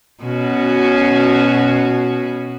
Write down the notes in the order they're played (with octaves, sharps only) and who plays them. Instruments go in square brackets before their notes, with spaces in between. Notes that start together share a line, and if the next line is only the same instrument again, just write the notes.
[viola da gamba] B2 C#4 F#4